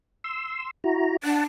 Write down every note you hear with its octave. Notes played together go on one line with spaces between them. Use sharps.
C6 E6
E4 F#4 A#5
D4 F#5 A5